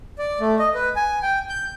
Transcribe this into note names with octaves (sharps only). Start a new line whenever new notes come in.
D5
A3
D#5
B4
G#5
G5
G6